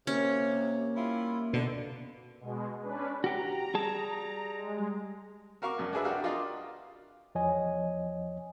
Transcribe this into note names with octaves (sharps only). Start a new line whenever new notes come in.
C3 A#3 C#4
G3 E4 F4
B2 D3
B2 G#3
C#4 D4 B4
F#4 G4 A#5
G3 G#4 A5
G#3
F#4 A#4 F5 C#6 D6
A#1 F#2
D4 F#4 G#4 B4 E5
D4 F#4 G4 F5 F#5 A#5
F4 A#4 D5 D#5 F5
E2 F3 C#5 D#5 G#5